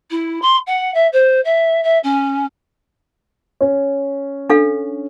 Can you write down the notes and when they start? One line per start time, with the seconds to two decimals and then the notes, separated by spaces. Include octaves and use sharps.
0.10 E4
0.42 C6
0.66 F#5
0.94 E5
1.12 C5
1.44 E5
1.83 E5
2.03 C#4
3.61 C#4
4.50 D4 A4 F5